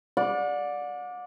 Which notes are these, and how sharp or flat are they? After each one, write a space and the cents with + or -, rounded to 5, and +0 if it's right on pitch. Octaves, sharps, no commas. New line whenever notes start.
D5 +0 F#5 -40